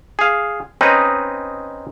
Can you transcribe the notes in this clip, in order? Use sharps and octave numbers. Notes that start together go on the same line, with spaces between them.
G#4 F5
C4 C#4 D#4 B4 D#5